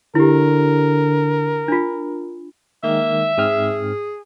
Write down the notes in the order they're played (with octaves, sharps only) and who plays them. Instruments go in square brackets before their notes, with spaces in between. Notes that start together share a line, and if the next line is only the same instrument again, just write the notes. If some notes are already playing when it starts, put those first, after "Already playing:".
[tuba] D3 [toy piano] E4 G4 [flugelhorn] A#4
[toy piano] D4 F4
[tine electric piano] D#3 G#3 [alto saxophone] A#3 [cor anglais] E5
[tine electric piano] G#2 C4 F6 [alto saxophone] G#4